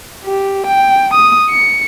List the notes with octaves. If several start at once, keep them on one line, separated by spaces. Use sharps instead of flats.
G4
G5
D#6
C#7